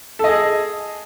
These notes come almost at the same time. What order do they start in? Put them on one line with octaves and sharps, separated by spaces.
A4 D#5 G#4